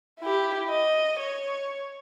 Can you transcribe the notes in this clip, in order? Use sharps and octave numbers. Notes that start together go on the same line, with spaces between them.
E4 G4
D#5
C#5